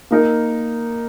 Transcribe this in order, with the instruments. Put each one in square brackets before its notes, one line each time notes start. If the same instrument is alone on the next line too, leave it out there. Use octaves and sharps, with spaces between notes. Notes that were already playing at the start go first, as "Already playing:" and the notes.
[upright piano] A#3 D#4 A#4